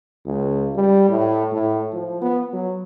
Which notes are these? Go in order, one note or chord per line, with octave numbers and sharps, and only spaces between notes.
C#2
G3
A2
A2
F3
B3
F#3